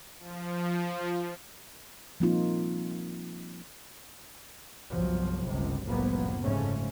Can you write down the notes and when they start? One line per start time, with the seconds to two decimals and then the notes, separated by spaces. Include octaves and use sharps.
0.18 F3
2.20 F3 G3 A#3 C4 D#4 F4
4.91 G1 C2 F3 F#3
5.45 G1 C#2 C3
5.86 F#1 C2 A2 F3 A#3 B3
6.43 F1 G#2 C#3 A3 C#4